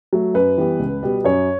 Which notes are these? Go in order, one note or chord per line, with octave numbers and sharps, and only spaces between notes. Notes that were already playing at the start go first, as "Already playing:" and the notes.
F#3 A3
F#2 B4
E3 G3 B3
C#2
B2 G3 B3
F#2 C#5